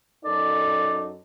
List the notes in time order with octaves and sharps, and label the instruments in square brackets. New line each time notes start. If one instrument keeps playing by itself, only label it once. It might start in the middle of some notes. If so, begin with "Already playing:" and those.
[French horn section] F#2 D#4 A4 [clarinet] D5